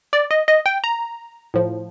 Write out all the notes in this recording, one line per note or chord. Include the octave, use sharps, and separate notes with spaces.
D5
D#5
D#5
G5
A#5
A2 F3